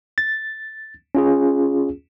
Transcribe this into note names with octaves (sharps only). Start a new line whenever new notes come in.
A6
C#4 F4 G#4